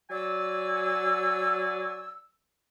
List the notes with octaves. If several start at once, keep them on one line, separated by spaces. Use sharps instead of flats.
F#3 D5 G#5 E6